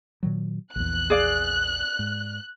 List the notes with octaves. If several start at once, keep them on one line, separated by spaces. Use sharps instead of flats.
A#2 D#3 F#3
A#1 E2 F#6
G#4 D5 F5
G#2